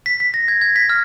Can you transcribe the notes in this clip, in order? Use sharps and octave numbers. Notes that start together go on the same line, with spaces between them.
B6
B6
A#6
G#6
G#6
B6
F6